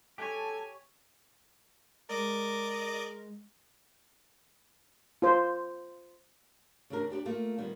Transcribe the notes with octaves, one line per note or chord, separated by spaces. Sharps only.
G4 A4 C#5 G#5 A5
G#3 A#4 D5 D#5 D6
F4 C5
D2 C#3 E3 D4 A#4
D4 G4 C5 D5
A3 A#3 F4
A#2 D#3 G3 B3